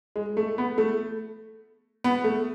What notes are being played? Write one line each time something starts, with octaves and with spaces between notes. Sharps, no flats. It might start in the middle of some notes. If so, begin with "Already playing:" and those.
G#3
A3
B3
A3
B3
A3